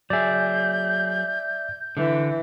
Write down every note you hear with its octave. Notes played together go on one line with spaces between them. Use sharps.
F#3 G#4 D5 E5 G6
D3 E3